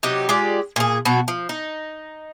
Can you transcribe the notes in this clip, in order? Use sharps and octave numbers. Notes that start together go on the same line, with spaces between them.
C3 F#3 D#4 G4
G#3 F4 G4 D5
A#2 G#4
B2 F#3 F#4
F3
D#4